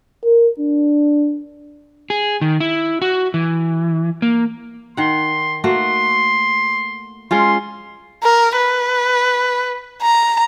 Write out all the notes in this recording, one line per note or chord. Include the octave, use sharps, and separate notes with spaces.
A#4
D4
G#4
D#3
E4
F#4
E3
A#3
D#3 F#5 C6
A3 A#3 F#4 C6
G#3 C#4 F4 C6
A#4
B4
A#5